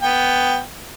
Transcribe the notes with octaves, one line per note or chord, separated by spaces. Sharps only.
B3 G5